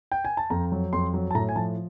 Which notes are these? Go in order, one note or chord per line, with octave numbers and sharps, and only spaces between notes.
G5
G#5
A5
F2 A#5
F#3
F2 C6
F#3
A5
A2 A#5
G#5
F3 A5